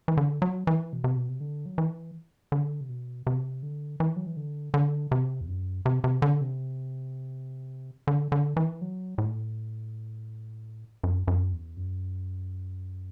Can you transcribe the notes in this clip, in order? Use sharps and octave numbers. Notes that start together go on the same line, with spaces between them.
E3
D3
F#3
E3
B2
C3
B2
C3
D3
F#3
E3
D3
C3
B2
C3
D3
E3
F#3
E3
D3
D3
C3
E2
F#2
C3
C3
D3
C3
D3
D3
E3
F#3
A2
F#2
F#2
E2
F#2